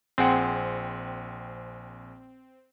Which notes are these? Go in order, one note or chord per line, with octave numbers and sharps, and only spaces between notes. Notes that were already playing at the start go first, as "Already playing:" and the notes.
A#1 C4 G#4 F#5